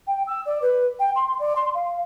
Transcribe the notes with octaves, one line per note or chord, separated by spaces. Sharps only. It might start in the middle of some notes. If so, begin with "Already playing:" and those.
G5
E6
D5
B4
G5
C6
D5
C6
F5